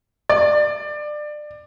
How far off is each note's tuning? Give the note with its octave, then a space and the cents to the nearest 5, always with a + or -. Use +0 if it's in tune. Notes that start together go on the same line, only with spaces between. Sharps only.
D5 +25